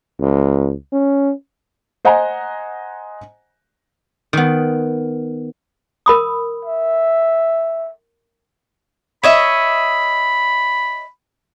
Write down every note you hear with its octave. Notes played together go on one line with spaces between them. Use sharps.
C#2
C#4
C5 D#5 F#5 G#5 A#5
D#3 B3
A#4 B5 D#6
E5
C#5 D#5 E5 B5